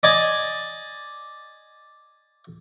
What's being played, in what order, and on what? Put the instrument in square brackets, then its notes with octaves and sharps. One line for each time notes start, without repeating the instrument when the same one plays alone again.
[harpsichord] D5 D#5 G#5 D6